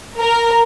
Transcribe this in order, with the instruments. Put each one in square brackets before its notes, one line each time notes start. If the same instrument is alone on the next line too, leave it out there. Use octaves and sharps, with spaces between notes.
[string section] A#4